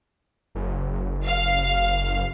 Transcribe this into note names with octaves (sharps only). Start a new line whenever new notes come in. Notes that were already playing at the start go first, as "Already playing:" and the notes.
F#1
F5